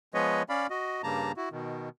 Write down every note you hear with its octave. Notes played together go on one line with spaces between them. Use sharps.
F3 G#3 B3 B4 C#5 D#5
C#4 D5 F5 B5
F#4 D#5
G2 C#3 G3 A#3 A5 A#5
E4 F#4
B2 D#3